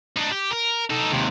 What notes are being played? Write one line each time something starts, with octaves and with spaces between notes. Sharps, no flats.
D4 D#4
G4
A#4
D#4 A4
D#2 C3